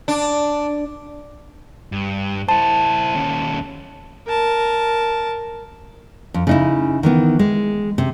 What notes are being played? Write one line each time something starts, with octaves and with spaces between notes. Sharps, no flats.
D4
G2
E4 C5 A5
D#2 C#4
A#4 A5
F2
C#3 D#4 E4
D#3 E3 B3
G#3
C3